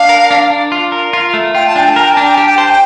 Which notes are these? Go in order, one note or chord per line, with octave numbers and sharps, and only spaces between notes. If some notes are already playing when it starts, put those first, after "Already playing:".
Already playing: D4 F5
A#4
D4
D4
F4
A#4
F4
A3
F4 G5
A5
D4 G5
A5
A#4 G5
A5
D4
G5
G4 A5
G5
C5 A5
G5